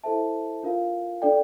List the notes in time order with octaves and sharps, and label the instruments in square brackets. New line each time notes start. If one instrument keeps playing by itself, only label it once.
[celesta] E4 A4 C5 E5 A5
D4 F4 A#4 F5
D4 A4 D5 G5